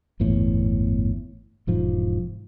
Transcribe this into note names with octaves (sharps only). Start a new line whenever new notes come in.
G1 E2 A2
E1 G#2 F3